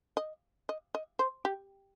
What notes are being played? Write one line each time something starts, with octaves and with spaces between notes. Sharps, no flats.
D#5
D#5
D#5
C5
G4